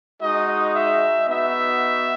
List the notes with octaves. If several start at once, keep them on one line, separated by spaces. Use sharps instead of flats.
G#3 D#4 F#4 D#5
E5
B3 D#4 F#4 E5